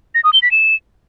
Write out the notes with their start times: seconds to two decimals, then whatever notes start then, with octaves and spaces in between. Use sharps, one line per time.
0.15 A#6
0.24 D#6
0.33 G7
0.42 B6
0.51 E7